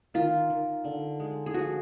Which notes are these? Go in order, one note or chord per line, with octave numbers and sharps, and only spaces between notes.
D#3 F4
D#3
D3
G#3
G#4
F3 F#4